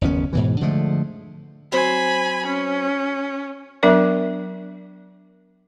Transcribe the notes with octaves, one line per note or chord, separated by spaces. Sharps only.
F#1 D#2 B3 C#4
G#2 B2 E3
D3 F3 G#3 A3
F#3 C4 C5 G#5 B5
C#4
F#3 B3 D4 A#4 D5 E5